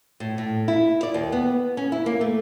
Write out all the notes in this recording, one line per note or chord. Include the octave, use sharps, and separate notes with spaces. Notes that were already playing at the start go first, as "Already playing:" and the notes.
A2
A2
E4
D5
D#2
B3
C#4
E4
A#3
A3